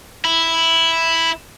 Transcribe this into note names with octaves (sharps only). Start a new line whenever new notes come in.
E4